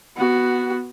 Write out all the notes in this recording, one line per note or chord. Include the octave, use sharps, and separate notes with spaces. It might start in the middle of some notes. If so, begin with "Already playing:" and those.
B3 F#4